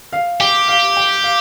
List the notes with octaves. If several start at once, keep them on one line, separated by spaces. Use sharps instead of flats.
F5
G4 G5
F5
G5
F5